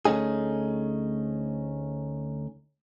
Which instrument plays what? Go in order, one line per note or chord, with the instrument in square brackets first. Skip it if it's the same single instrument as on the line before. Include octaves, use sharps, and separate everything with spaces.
[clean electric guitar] D2 A3 C#4 D#4 G#4